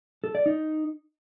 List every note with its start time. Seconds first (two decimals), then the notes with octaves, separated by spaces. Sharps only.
0.24 A4
0.35 D5
0.46 D#4